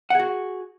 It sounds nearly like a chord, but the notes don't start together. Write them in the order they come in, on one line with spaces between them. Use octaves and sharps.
F#5 G#4 F#4